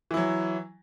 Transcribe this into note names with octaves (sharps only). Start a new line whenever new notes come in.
E3 F#3 E4